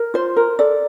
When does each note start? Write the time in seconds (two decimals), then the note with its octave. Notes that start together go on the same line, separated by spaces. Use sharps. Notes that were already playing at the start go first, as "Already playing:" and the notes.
Already playing: A#4
0.14 F4 C5
0.36 A#4
0.59 A4 D5